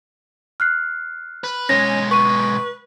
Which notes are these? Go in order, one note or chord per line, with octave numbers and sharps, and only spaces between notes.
F6 F#6 C7
B4
B1 G#3 C#4 A#6
B4 C#6 D#7